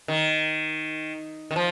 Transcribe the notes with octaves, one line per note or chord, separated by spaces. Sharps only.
D#3
D#3
F3